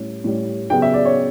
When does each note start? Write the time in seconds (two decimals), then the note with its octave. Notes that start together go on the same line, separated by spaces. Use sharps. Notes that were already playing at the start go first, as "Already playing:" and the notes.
Already playing: A2 G3 C#4
0.24 A2 G3 C#4
0.70 C#3 F#3 B3 G5
0.82 E5
0.94 D5
1.05 C#5